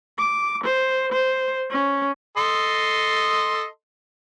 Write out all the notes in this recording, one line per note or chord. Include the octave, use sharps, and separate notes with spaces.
D6
C5
C5
C#4
A4 D#5 C6